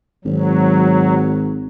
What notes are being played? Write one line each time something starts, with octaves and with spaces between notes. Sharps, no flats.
G#1 F#3